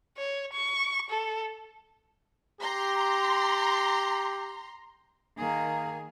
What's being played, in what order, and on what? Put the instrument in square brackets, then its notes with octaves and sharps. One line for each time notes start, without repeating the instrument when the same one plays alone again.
[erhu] C#5
C#6
A4
[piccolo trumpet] G4 [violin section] A#5 C6
[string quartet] D#3 G#4 A#4 [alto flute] A#3